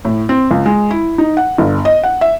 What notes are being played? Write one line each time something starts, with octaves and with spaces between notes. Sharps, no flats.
A2
C4
C#2
G#3
E4
D#4
F#5
G1
D#5
F#5
E5